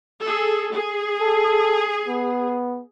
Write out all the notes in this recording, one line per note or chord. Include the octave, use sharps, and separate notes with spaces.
G#4 A4
G#4
A4
B3